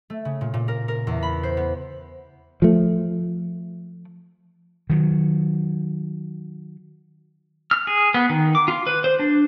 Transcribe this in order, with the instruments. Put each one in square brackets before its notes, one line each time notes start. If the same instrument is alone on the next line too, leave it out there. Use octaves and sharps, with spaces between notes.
[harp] A3
C#3
A#2
A#2
A#4
A#4
E2
B5
C5
B3
[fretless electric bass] F3 A3
[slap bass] D#3 F#3
[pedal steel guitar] F6
G#4
B3
D#3
D6
F4
B4
C5
D4